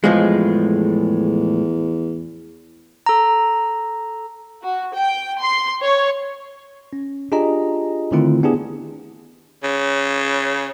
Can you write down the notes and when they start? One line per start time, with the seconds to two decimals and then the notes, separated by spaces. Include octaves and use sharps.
0.04 E2 A2 F3 G#3
3.06 A4 A#5
4.63 F#4
4.95 G5
5.41 C6
5.81 C#5
6.93 C#4
7.32 D4 F4 G4 G#4 D#5 A#5
8.12 D3 D#3 A3 C4 E4 F4
8.43 B3 D4 E4 G4 G#4
9.63 C#3